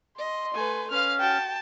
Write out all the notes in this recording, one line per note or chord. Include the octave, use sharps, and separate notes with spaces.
D#5 C6
A3 B4 G#5
C#4 B4 F5 F6
F#4 G5 A5